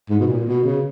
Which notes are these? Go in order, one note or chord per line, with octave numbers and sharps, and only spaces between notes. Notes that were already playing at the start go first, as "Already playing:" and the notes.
G#2
B2
A#2
B2
C#3